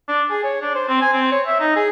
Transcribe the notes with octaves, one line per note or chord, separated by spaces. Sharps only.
D4
G#4
C#5
D4
C5
C4
G#5
C4
C#5
E5
D#4
G#4